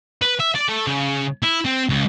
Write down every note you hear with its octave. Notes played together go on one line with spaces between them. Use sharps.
B4
E5
D5
A3
C#3
E4
C4
C#2